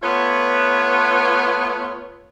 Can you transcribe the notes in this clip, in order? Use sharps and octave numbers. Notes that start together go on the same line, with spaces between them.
A3 B3 F4 B4 C#5